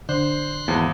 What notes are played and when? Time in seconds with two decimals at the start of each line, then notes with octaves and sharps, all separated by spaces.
0.09 D3 C5 C6 F#6
0.68 G#1 E2 A5